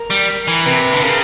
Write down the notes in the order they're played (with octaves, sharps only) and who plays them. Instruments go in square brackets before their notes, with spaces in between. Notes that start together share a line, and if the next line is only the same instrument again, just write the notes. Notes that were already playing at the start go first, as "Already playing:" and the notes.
Already playing: [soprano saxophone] A#4
[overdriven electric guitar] G3
E3
[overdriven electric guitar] C3 [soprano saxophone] B4
[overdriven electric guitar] D3
[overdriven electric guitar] C#3 [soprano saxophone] A#4